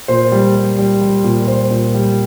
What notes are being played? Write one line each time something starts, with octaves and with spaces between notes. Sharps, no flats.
A#2 C5
G3
G3
G3
G3
A#2
G3 C5
A#2
G3